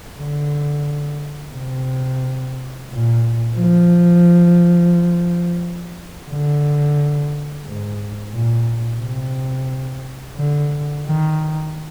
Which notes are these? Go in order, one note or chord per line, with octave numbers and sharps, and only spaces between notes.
D3
C3
A#2
F3
D3
G#2
A#2
C3
D3
D#3